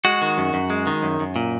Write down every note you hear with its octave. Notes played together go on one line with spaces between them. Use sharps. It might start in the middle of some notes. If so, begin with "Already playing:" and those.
G#3 F#4
D#3
F#2
F#2
G#3
D#3
F#2
F#2
A#2